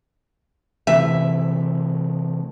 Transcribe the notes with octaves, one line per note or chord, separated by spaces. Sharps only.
C3 E3 A3 E5